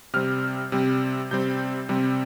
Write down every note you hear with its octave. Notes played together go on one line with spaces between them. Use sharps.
C3 G3 C4 F6
C3 G3 C4
C3 G3 C4 G6
C3 G3 C4